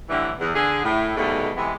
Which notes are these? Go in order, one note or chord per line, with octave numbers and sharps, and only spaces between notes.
A2 D3 E3 G3
E2
D3 G#4
A2
G#2 B2 G3 A3
C3 E3 G#3 B3